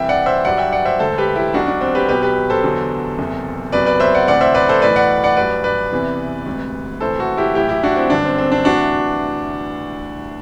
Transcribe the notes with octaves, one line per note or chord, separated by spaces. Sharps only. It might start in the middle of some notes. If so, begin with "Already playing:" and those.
Already playing: C2 C3 E3 E5 G5
D5 F#5
C5 E5
G1 G2 F#3 D5 F#5
E5 G5
D5 F#5
C5 E5
E1 D2 D3 A4 C5
G4 B4
E4 G4
B1 B2 F#3 D4 F#4
D4
C4
G4 B4
B1 B2 F#3 G4 B4
G4 B4
A4 C5
E2 D3 F#3
F#1 E2 C3
F#1 E2 C3 F#3 B4 D5
B4 D5
C5 E5
D5 F#5
D2 C3 E3 D5 F#5
C5 E5
B4 D5
A4 C5
B1 A2 E3 B4 D5
D5 F#5
D5 F#5
A1 G2 F#3 B4 D5
B4 D5
E2 C3 E3
E1 D2 C3
D2 C3 E3 A4 C5
F#4 A4
E4 G4
A1 A2 F#3 E4 G4
E4 G4
D4 F#4
C4 E4
G1 F#2 D3 F#3 D4
C4
C4
D4
D2 C3 E3 D4 F#4